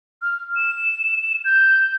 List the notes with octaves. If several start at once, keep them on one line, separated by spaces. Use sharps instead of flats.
F6
E7
G6